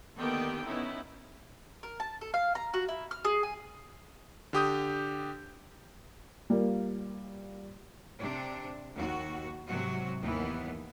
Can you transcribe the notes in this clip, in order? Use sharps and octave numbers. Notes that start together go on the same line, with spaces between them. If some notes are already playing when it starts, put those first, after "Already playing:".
D3 D#3 A#3 B3 G4 G5
B3 C#4 D#4 E4
A#4
A5
A4
F5
A#5
F#4
E4
F6
G#4
G#5
D3 G4 D#6 G6
G3 A#3 F4
C3 D4
D#2 F#4
G#2 C3 F#3 F#4
D#2 E3 B3